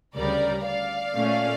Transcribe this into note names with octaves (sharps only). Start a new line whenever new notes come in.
D2 C#3 G3 A#4 D5
D5 F5
A#2 A3 C#4